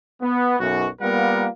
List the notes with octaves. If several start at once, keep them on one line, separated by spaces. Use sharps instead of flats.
B3
B1 F#2 F#4
G3 A#3 B3 F4 A#4 F#5